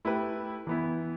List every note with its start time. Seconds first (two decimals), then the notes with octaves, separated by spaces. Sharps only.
0.05 A3 E4 G4 B4
0.67 E3 B3 E4